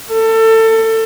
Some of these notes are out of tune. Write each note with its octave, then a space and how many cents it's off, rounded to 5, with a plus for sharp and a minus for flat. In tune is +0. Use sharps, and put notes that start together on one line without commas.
A4 +25